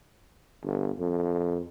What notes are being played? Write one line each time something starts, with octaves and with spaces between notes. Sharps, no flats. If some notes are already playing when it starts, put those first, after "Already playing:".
G1
F2